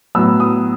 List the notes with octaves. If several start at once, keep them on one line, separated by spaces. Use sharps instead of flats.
A2 F#3 B3 E6
D#6